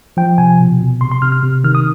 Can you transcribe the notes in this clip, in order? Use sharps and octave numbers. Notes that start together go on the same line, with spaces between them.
F3 G5
C3 G#5
B2
B2
C3 C6
C6
C3 F6
F6
C3
D#3 F6
D#6